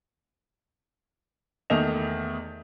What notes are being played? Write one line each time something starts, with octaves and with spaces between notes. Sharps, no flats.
E2 D#3 A3 D#5 E5 F7